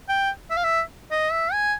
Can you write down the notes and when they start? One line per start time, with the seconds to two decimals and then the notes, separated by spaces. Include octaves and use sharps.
0.09 G5
0.50 E5
0.57 F5
0.64 E5
1.11 D#5
1.32 E5
1.53 G#5